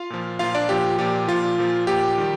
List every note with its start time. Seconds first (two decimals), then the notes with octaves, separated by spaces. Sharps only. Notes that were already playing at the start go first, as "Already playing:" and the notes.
Already playing: F4 F5
0.10 A#2 F3
0.39 A#2 F3 F4 F5
0.55 D4 D5
0.69 A#2 F3 G4
0.98 A#2 F3 G4
1.28 A#2 F3 F4
1.58 A#2 F3
1.87 A#2 F3 G4
2.18 D#3 G3